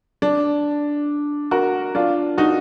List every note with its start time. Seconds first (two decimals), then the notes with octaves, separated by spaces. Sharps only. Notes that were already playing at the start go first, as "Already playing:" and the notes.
0.22 D4
1.51 F#4 A#4
1.95 D4 F4
2.38 D#4 F#4